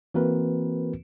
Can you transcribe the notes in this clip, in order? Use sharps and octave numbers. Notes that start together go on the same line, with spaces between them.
E3 A#3 C4 F#4 A#4 B4